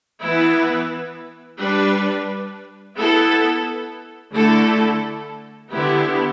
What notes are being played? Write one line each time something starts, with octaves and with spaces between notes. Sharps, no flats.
E3 B3 E4 B4
G3 D4 B4
B3 E4 A4
D3 A3 E4 A4
D3 B3 E4 G4